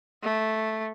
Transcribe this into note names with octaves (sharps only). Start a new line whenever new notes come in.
A3